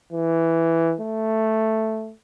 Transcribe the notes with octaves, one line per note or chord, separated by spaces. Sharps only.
E3
A3